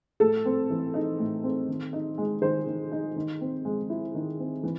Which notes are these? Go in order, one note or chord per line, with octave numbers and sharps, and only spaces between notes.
A2 A4
C4
E3
D#4
A2
C4
D#3
D#4
G#3
D#3 C5
D#3
D#4
D#3
C4
G#3
E4
D#3
C4
E3